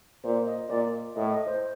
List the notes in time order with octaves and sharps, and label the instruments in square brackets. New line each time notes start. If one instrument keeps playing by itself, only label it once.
[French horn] A#2 [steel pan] C5
[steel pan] D#5
[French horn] A#2 [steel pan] D5
[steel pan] D#5
[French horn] A2 [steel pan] D#5
[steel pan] D#5
C5